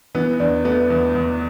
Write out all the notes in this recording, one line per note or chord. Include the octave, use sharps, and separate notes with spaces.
E3 B3
E2 D4
A3 B3
E2
E2